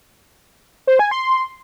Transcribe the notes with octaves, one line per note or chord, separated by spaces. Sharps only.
C5
G#5
C6